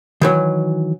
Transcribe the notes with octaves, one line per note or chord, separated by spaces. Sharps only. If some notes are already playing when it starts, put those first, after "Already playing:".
D#3 E3 F#3